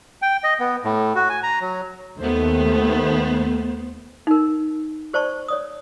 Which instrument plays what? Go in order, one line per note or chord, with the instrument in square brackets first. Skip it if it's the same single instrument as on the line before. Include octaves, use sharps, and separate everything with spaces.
[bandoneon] G5
D#5
B3
A2
F#4
G#5
A#5
F#3
[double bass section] D#2 D#3 A3 [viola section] B3 C5
[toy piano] D#4 A#4
G4 C5 D5 A5 C#6
C#5 D5 D#6